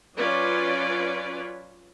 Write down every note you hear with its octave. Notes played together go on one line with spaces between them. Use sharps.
F#3 C#4 F4 B4 D5